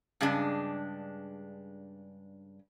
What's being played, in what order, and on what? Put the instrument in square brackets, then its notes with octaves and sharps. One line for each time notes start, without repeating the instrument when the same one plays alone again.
[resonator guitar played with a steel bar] G2 C#3 G#3 D4